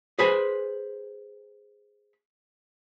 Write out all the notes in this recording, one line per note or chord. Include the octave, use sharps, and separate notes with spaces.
G#4 B4 C5 G#5